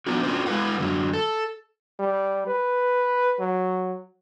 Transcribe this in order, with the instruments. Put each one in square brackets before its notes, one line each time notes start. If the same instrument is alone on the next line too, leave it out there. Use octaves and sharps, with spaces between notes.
[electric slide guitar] F3 A#3 B3 D4 D#4 F#4
C#4 D4 F4 F#4 C5
G#3 E4 B4 F5 F#5
F#2 D3 F#3
A4
[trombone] G3
B4
F#3